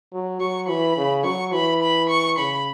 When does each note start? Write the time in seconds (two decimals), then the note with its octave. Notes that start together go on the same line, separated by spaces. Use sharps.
0.13 F#3
0.41 F#3 C#6
0.69 E3 B5
0.97 C#3
1.25 F#3 C#6
1.54 E3 B5
1.82 B5
2.10 C#6
2.39 C#3 B5